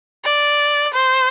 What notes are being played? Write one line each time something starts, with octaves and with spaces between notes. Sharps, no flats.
D5
C5